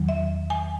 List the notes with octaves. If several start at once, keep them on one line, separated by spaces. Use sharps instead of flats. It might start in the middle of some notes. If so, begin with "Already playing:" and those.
Already playing: E2 D#3 F#3
E5
G#5